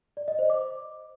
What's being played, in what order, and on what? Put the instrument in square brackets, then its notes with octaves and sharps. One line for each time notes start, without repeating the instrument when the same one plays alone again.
[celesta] D5
D#5
C5
D6